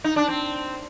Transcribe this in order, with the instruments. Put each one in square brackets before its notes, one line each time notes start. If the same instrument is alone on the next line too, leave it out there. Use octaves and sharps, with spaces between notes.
[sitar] D#4
D4
C4